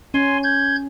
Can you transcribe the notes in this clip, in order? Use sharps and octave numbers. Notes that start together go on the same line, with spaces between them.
C#4 G#5 C6
G6 G#6